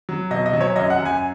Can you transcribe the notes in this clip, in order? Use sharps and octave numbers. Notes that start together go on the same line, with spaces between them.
F#3
B2 D#5
D#5
F#3
C#5
F#2 D#5
F#5
F#2
G#5